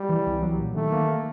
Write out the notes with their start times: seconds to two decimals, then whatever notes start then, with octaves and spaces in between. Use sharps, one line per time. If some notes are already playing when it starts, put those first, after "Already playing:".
Already playing: G3
0.09 E3
0.26 C2
0.42 F#3
0.59 A#2
0.75 D#3 A3
0.92 A#3
1.08 A#3